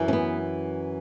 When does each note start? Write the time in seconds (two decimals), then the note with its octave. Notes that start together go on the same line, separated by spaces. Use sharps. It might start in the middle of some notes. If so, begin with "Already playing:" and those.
Already playing: F#2 E3
0.08 C#4
0.13 B3